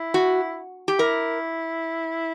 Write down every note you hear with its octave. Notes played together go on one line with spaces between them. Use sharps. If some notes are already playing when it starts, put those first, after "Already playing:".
Already playing: E4
F#4
G4
E4 A#4